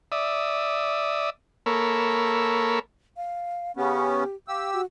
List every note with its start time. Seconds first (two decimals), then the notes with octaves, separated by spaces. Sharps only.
0.12 D5 E5 D#6
1.66 A#3 A4 A#4 C#5 B5 E6
3.17 F5
3.77 C#3 B3 C#4 G4
4.48 G4 F5 E6
4.73 F#4